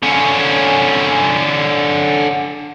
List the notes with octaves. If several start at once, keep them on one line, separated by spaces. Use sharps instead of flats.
D3 C#4